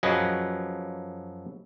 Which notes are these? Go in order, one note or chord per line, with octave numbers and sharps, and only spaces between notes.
F#2 F3 F#3 G#4 B4 D#5